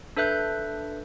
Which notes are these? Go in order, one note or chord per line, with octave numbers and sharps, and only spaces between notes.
D4 A4 B4 E5 F#6 G6